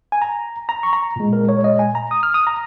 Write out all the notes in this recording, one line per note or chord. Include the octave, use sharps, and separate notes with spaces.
G#5
A#5
A#5
C#6
A#5
A#2 G#3
A#4
C#5
D#5
G#5
A#5
D#6
F6
D#6
A#5